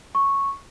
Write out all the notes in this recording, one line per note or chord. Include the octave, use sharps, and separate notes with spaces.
C#6